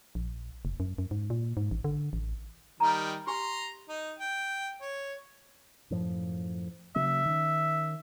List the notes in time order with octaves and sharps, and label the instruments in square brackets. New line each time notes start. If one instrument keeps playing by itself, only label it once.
[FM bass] A#1
F1
F#2
F#2
G#2
A#2
G#2
A1
D3
A1
[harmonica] D#3 G3 [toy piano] A5 A#5
[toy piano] G4 G#5 [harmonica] A#5 C6
[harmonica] D#4
G5
C#5
[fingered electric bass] F#2 A2 F3
[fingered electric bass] C#3 F#3 A#3 [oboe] E5
[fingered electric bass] D#3 C#4